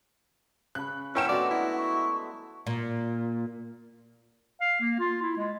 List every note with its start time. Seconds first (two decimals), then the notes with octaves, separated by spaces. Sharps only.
0.75 C#3 B5 F#6
1.15 B3 C#4 E4 A#4 F#5 G5 C#6 E7
1.29 F#3 G#3 A3 D4 F#4 D5
1.51 E4
1.77 C#6
2.67 A#2
4.61 F5
4.81 A#3
4.99 F4
5.22 E4
5.37 G#3